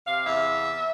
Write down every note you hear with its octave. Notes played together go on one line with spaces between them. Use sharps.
C3 F5
E2 E5